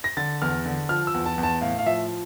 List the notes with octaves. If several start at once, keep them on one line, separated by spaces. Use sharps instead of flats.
A#6
D3 A6
E2 F6
D3
F3 F6
E6
E2
A5
E2
A5
A2 F5
F5
F3 E5